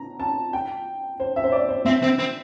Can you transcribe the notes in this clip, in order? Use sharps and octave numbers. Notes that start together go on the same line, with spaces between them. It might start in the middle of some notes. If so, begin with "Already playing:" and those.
Already playing: A#5
A5
G5
C5
E5
C5
D5
C5
C4 E5
C4
C4